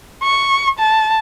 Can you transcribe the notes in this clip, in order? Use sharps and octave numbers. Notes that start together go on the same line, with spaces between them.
C#6
A5